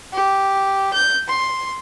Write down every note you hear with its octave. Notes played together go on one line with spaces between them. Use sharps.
G4
G6
C6